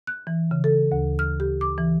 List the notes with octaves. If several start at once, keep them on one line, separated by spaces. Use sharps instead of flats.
F#6
E3
C#3
A4
D2
F6
G4
D6
E3